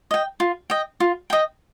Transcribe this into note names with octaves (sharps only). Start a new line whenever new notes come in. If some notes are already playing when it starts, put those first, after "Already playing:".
D#5 G5
F4
D#5 G5
F4
D#5 G5